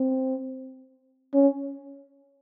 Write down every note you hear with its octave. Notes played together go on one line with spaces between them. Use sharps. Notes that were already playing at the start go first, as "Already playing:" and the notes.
Already playing: C4
C#4